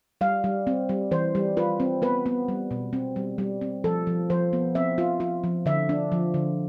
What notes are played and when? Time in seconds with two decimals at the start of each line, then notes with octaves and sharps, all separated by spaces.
0.21 G3 F5
0.44 G3
0.67 C4
0.89 G3
1.11 E3 C5
1.35 G3
1.57 F4 B4
1.80 C4
2.02 B3 B4
2.26 B3
2.49 G3
2.71 B2
2.93 C4
3.16 G3
3.38 G3
3.61 C4
3.84 F3 A4
4.07 F3
4.30 F3 C5
4.53 B3
4.75 C4 E5
4.98 F4
5.20 F4
5.44 F3
5.66 D3 E5
5.89 D4
6.12 F3
6.34 D3